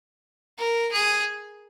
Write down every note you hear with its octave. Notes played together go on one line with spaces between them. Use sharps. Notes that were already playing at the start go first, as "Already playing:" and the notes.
A#4
G#4